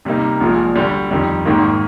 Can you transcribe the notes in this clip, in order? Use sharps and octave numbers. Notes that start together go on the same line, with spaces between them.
C3 G3 A#3 D#4
A#1 A#2 F3 G#3
D2 D3 G3
F2 D#3 G3
G#1 G#2 D#3 A#3